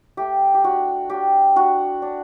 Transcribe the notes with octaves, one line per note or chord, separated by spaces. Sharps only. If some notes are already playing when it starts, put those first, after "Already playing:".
A3 G4
G4
D4 F#4
D4 G4
D4 F#4
D4